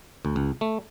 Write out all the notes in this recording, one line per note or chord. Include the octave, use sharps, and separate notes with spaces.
D2
C#2
A3